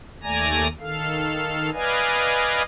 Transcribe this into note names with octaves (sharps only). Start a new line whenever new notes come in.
D#2 A3 D5 G#5 A#5 A#6
D#3 A4 F5
B4 D5 D#5 F5 G#5